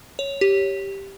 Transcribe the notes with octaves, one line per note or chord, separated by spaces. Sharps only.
C#5
G4